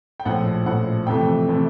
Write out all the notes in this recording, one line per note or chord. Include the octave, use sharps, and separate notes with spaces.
G5
A#1 A2 F3 F#5
A#1 A2 F3 F#5
F2 C3 E3 A3 G5
C3 E3 A3